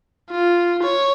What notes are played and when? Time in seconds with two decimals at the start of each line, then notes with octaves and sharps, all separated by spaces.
0.30 F4
0.82 C#5